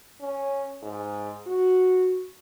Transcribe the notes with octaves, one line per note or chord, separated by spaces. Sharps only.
C#4
G#2
F#4